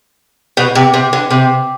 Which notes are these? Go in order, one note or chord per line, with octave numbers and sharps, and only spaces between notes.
B2
C3
C3
D3
C3